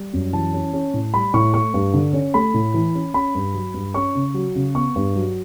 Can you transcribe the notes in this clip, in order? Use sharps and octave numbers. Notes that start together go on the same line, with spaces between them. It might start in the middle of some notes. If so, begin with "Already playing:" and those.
Already playing: G3
F#2
E3 A5
C#4
C#4
A2
G3 B5
A2 C#6
A3 C#6
G2
D3
C#4
A3 B5
A2
E3
C#4
C#4 B5
G2
F#3
G2
C#4 C#6
C#3
F#3
C#3
B3 C#6
G2
F#3